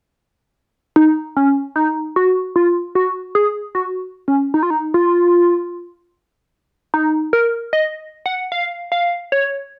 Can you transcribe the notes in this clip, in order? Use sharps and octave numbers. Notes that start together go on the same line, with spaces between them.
D#4
C#4
D#4
F#4
F4
F#4
G#4
F#4
C#4
D#4
F4
D#4
F4
D#4
A#4
D#5
F#5
F5
F5
C#5